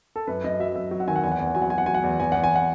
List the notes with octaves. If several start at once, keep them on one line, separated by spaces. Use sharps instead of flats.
A4
F#2 B4
F#2 D#5
F#3 E5
F#2 E5
F#3
F#5
D#3 G#5
F#5
E2 G#5
F#5
E2 G#5
F#5
F#3 G#5
F#5
F#3 G#5
F#5
F#3 G#5
F#5
E2
E2 G#5
E2 F#5
G#5
F#5